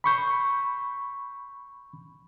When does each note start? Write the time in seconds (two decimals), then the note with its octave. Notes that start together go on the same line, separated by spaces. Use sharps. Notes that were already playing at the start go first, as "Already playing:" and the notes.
0.04 B5 C#6 G6